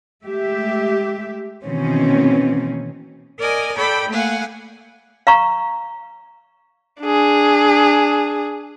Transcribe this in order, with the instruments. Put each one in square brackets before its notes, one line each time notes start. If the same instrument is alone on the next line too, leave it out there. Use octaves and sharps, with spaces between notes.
[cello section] G#3 A3 G4 E5
B2 D#3 E3 A#3 C4 C#4
[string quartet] A#4 D5 D#5 G#5
A4 D5 G5 B5
A3 A#3 F5 F#5 G#5
[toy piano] F5 A#5 C#6
[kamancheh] D4 G#4